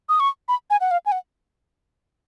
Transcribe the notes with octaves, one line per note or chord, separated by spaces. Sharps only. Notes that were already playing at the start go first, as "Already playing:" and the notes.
D#6
C#6
B5
G#5
F#5
F5
G#5
F#5